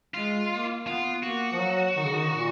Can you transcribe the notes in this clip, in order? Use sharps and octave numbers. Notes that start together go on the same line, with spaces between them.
G#3 F4
A#3
B3 F4
A#3 F#4
F3
F#3
D#3
C#3
D#3
A#2